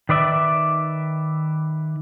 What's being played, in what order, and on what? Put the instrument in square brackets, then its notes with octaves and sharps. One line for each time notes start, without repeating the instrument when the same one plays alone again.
[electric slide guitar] D#3 B4 D5 E5